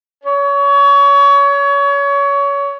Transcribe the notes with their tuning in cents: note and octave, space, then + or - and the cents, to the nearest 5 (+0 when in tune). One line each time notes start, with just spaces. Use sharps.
C#5 +25